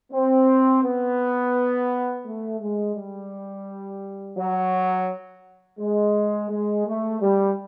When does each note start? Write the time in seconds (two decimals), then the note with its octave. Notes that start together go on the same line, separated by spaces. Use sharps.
0.12 C4
0.83 B3
2.25 A3
2.60 G#3
2.95 G3
4.37 F#3
5.79 G#3
6.50 G#3
6.86 A3
7.21 G3